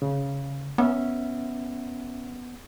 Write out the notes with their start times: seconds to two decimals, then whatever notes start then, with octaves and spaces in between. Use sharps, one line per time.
0.02 C#3
0.78 B3 C#4 E5